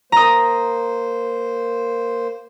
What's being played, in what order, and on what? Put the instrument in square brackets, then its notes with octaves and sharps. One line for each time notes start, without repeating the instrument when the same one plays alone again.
[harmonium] A#3 C5 [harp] A#5 D#6